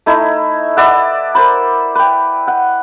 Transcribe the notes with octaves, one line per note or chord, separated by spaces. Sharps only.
A3 D#4 E4
B4 D5 E5 F#5
A#4 C5 B5
B4 G5
F#5